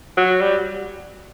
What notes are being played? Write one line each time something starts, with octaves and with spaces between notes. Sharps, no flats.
F#3
G3